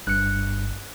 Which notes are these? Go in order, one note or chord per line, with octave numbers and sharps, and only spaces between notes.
G1 G2 F#6 C#7